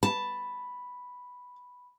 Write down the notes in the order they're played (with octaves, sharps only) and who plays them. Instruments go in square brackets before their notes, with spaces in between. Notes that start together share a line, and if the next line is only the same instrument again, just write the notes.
[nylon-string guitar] A5 [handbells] B5